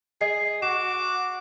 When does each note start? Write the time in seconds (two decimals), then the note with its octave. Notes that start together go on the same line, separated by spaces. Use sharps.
0.21 G#4 D#5 C7
0.62 F#4 D6 E7